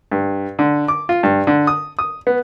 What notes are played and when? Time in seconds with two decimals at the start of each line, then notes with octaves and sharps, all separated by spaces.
0.12 G2
0.59 D3
0.88 D6
1.09 F4
1.23 G2
1.47 D3
1.67 D#6
1.99 D#6
2.27 B3